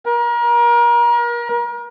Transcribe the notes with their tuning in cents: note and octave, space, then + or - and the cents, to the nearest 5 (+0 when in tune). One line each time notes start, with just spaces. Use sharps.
A#4 +35